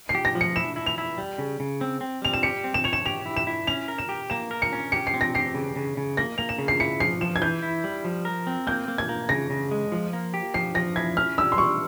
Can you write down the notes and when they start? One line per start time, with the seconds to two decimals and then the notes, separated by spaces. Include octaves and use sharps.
0.09 C7
0.15 G4
0.25 A#6
0.35 F3
0.41 C#7
0.56 E4 E7
0.76 E4
0.86 F7
0.98 E4
1.18 G3
1.38 C#3
1.60 C#3
1.81 C4
2.01 C4
2.22 G3 F7
2.33 E7
2.43 G4 C#7
2.64 C4
2.74 E7
2.84 C#5 F7
2.93 E7
3.06 G4 F7
3.26 E4
3.37 E7
3.47 E4
3.67 C#4 F7
3.88 A#4
3.98 E7
4.09 G4
4.30 A#3 E7
4.51 A#4
4.62 C#7
4.72 C#4
4.92 G4 C#7
5.07 C7
5.14 C4
5.21 A#6
5.35 G4 C7
5.54 C#3
5.76 C#3
5.97 C#3
6.17 A#3 A#6
6.38 A#3 F7
6.49 E7
6.58 C#3
6.68 C7
6.80 E4 C#7
7.00 F3 C7
7.21 F3 E7
7.36 G#6
7.42 E3 G6
7.63 E4
7.84 G3
8.04 F3
8.25 A#4
8.47 C4
8.67 A#3 G6
8.88 A#3
8.98 G#6
9.09 A#3
9.29 C#3 A#6
9.50 C#3
9.71 G#3
9.92 F3
10.13 A#3
10.34 G4
10.54 F3 C7
10.75 F3 A#6
10.96 E4 G#6
11.17 C#4 F6
11.38 G3 E6
11.52 C6
11.58 G3 C#6